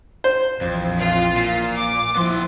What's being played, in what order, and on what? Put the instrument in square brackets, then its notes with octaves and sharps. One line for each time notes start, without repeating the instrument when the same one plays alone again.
[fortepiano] C5
[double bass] A#1 E3 [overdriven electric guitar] F2
[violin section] F4
[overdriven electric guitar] A#2
[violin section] D6
[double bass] F3 E4 [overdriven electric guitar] B3 C6